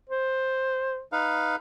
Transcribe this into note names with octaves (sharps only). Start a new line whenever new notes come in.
C5
D#4 B4 F5